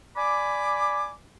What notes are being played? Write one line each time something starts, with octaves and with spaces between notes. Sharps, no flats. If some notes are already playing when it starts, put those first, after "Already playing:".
D5 G#5 B5 D6